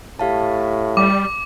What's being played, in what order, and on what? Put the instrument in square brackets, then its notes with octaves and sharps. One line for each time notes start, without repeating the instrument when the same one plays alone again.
[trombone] A2 [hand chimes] G4 F5 A5
[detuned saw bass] G3 [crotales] D6